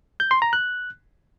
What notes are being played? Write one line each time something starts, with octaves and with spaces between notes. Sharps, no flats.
G6
C6
A#5
F#6